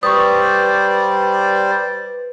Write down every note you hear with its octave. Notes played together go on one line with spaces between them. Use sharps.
G3 B4 C5 D5 C#6 D#6